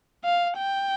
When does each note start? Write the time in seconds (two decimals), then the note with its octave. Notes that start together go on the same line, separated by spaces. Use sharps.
0.25 F5
0.58 G5